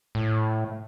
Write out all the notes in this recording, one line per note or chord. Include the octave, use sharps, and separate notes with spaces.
A2